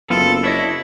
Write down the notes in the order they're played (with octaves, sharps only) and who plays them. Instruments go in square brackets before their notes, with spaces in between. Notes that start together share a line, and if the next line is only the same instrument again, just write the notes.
[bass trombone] F#1 [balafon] F#3 [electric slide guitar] B3 C4 F4 [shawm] A4
[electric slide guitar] D4 C#5 D#5 [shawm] E4